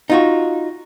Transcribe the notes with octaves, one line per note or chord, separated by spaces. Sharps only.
D#4 F4 F#4